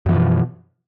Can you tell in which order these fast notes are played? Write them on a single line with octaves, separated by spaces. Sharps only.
F#2 E3 F3 B2